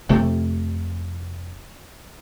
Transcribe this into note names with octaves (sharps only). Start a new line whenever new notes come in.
F1 C3 A3